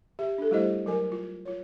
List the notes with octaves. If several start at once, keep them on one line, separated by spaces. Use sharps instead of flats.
G4 E5
D4 A4
G3 A3 E4 G4 C5 D#5
F#3 A#4 G#5
F4
F4 C#5